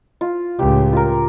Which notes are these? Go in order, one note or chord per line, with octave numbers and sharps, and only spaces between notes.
F4
C#2 A2 G4
F4 A#4